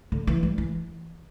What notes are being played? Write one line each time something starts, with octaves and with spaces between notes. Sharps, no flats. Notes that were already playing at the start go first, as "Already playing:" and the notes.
D3
E3
G3
E3